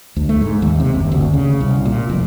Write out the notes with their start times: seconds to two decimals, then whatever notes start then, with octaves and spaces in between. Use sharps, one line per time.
0.16 D2
0.29 A3
0.41 G#2
0.62 D#2
0.80 C3
0.94 F#1
1.12 D2
1.34 C#3
1.61 C2
1.86 A#2
2.10 F1